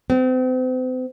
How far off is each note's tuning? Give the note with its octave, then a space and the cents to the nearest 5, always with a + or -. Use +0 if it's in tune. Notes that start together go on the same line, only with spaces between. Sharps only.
C4 -40